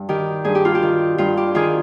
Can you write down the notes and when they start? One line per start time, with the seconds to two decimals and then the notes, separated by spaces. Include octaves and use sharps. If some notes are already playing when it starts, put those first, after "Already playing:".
Already playing: G2
0.09 D#3 G4
0.44 G2 G#4
0.55 G4
0.65 F4
0.75 G4
0.82 D#3
1.18 G2 F4
1.37 G4
1.55 D#3 F4 G#4